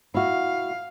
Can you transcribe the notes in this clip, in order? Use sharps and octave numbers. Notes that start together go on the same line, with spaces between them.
E4 F#4 F5